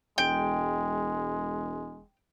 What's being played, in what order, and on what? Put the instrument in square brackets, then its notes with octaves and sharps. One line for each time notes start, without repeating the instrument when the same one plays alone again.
[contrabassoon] E1 [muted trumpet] G#3 [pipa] G5